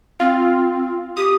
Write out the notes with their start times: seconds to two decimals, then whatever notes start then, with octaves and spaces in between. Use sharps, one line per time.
0.20 C4 F4
1.17 G4 D#6